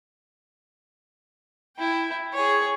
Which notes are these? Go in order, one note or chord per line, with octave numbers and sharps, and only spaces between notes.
E4 G5
G#4 C#5